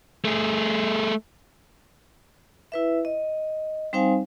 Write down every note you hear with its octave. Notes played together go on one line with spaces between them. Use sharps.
A3 G#4
E4 B4 E5
D#5
G3 C4 D#4 C5 F5 G#5